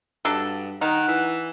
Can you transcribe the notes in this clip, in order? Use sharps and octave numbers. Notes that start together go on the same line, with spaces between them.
G2 F#3 D4 A4
D#3 D#4 F#5
E3